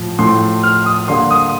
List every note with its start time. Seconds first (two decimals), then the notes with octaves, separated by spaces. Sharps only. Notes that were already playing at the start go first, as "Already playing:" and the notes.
Already playing: A2 F3
0.19 A2 F3 A3 C6
0.63 F6
0.86 D#6
1.08 D3 G3 A#3 C6
1.31 D#6